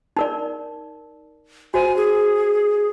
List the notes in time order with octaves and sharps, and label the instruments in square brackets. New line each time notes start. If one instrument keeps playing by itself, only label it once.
[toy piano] D#4 A#4 D5
[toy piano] F#4 C5 [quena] G#5
[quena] G#4